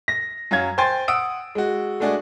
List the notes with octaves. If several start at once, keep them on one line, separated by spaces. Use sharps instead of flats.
A#6
F#2 F#3 F5 G#6
C5 G5 G#5 C6 A6
F#5 D#6 E6 D7
G#3 F#4
G#3 A3 D4 F#4 G#4